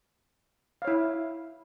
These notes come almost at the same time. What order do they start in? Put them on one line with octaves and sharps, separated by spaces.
F5 C#5 E4